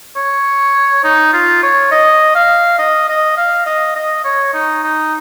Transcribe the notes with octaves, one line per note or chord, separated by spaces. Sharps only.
C#5
D#4
F4
C#5
D#5
F5
D#5
D#5
F5
D#5
D#5
C#5
D#4
D#4